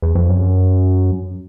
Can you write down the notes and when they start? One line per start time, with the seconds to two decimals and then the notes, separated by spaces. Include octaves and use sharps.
0.02 E2
0.15 F2
0.29 F#2